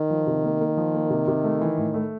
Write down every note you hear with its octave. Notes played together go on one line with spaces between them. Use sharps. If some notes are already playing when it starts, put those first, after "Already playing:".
Already playing: D#3
F3
C3
A#3
A#3
F3
A#3
C3
C3
A3
E3
A2
A3